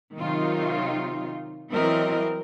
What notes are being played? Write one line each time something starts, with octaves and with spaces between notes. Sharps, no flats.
C3 D#3 F#3 C4 D#4 F4
E3 F#3 C4 E4 A#4 D#5